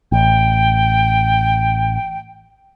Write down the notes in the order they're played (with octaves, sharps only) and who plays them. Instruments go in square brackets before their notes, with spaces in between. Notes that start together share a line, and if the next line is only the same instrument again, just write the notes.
[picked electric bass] A1 [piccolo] G5